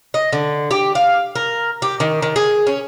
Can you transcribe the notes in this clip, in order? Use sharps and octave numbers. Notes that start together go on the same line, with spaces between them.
D#5
D3
G4
F5
A#4
G4
D#3
D#3
G#4
C#4